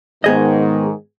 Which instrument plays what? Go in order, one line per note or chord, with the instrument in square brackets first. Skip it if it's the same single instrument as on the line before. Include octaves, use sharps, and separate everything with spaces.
[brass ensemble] G#2 D#3 [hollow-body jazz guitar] B3 G#4 D#5